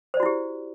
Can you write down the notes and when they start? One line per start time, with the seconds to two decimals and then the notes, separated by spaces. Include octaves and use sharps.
0.14 C5
0.17 D5
0.20 F#4
0.23 E4
0.26 G4